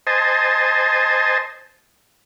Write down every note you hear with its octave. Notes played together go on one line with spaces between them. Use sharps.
C5 D#5 G#5 A5